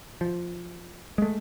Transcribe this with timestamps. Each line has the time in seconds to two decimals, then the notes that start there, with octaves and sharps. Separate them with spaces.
0.21 F3
1.18 G#3 A3